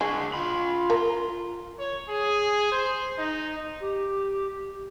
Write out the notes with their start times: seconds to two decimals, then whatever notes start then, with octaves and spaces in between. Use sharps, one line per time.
0.01 G#3 D4 F#4
0.34 F4 B5
0.90 A#4 A#5
1.79 C#5
2.08 G#4
2.71 C5
3.18 D#4
3.80 G4